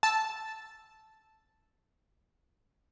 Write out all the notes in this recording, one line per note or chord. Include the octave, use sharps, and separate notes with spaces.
A5 E6